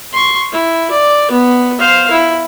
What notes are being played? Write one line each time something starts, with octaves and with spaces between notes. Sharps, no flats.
C6 C#6
E4
D5
B3
C5 F5
E4